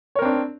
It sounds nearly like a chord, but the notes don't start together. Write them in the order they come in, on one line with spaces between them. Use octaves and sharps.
C#5 A#4 C4 D4